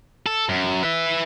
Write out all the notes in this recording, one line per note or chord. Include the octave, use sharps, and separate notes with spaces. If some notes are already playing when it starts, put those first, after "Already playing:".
A4
F#2
B4 E5